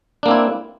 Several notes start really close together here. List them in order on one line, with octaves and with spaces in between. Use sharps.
D4 A#3 C4 E4